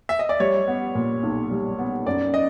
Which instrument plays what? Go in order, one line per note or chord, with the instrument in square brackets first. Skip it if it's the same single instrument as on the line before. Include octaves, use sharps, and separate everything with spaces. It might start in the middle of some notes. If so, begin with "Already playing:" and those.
[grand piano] E5
D#5
D5
[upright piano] G3 [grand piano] C#5
[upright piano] B3
A#2
B1
G3
B3
[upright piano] F#2 [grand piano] D5
[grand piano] D#5